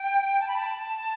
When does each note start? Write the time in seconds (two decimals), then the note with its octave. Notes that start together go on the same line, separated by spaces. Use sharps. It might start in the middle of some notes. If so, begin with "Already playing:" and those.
Already playing: G5
0.40 A5
0.48 B5
0.56 A5